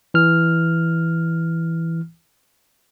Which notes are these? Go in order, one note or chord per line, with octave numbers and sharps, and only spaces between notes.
E3 F6